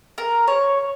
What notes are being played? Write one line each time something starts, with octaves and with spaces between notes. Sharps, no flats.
A#4
C#5